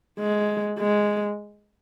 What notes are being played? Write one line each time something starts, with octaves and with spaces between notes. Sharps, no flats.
G#3
G#3